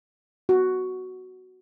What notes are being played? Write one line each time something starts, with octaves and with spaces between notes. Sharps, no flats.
F#4